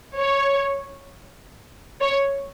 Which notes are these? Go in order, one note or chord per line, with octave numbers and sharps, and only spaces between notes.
C#5
C#5